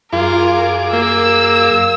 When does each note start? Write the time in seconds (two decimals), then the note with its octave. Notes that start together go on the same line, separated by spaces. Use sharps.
0.13 F#2 F4 G#4 A#4 D6
0.93 A#3 E6